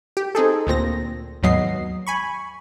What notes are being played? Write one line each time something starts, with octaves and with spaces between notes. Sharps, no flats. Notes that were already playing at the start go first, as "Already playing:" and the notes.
G4
C4 D#4 G#4 A4
D2 A#2 C4 A#6
D#2 G#2 F#3 B3 D#5 C7
G#5 B5 C#6